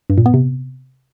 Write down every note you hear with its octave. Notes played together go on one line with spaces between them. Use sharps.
G2
A#2
B3
C3